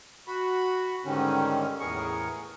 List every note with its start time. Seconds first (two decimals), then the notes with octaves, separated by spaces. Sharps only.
0.27 F#4 B5
1.05 G#2 D3 D#3 G3 C#4
1.80 E2 A2 B3 G#4 A#4 C#6